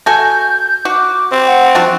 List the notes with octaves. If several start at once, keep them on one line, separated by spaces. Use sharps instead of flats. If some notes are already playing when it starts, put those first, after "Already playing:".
F#4 A4 G#5 G6
F#4 D6
C4
F#5
F3 D4 F4 F#4